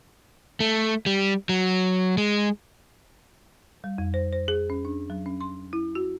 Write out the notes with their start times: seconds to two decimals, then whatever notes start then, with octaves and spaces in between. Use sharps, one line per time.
0.60 A3
1.06 G3
1.49 F#3
2.18 G#3
3.84 G3
3.98 F2
4.14 C5
4.33 C5
4.48 G#4
4.70 C#4
4.85 D4
5.10 F#3
5.26 C#4
5.41 C6
5.73 E4
5.95 F#4